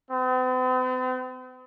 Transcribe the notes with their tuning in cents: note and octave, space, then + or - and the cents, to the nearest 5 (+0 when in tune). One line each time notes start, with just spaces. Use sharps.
C4 -45